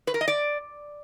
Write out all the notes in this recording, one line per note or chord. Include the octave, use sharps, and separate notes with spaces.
B4
A#4
D#5
D5